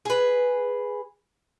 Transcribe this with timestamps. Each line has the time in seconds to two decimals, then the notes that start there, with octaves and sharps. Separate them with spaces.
0.05 G#4 B4